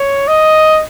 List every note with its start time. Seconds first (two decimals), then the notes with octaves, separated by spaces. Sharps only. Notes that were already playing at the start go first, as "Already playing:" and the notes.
Already playing: C#5
0.28 D#5